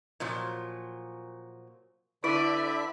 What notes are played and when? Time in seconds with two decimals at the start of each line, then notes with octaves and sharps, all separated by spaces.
0.20 A#2 F3 F#3
2.24 D3 E4 B4 D5 E5